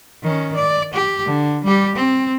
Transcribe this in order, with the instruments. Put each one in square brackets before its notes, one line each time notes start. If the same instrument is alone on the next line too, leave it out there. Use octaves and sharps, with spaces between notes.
[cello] D#3 C#4
D5
G4
D3
G3 G4
C4